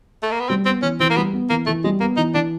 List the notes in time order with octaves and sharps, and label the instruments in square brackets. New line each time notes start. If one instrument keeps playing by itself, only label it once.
[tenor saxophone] A3
A#3
B3
[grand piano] G3 [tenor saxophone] C4
[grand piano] B3 [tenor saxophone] C4
[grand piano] E3 [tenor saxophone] C#4
[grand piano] E3 [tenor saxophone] C4
[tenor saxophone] A#3
[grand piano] G3 [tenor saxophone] B3
[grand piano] B3
[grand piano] E3 [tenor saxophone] A#3
[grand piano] E3 [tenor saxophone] A3
[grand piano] G3 [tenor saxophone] G#3
[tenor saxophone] A#3 [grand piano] B3
[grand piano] E3 [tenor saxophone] D#4
[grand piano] E3 [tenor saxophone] D4